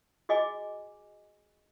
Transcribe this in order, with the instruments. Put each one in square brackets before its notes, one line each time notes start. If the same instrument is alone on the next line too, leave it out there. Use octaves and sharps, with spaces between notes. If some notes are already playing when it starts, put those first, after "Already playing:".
[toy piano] F#4 G#4 D#5 G#5 D6